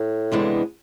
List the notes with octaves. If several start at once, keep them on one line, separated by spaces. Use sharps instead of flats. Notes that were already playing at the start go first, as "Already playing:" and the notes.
Already playing: A2
C3 E3 G#3 B3 D4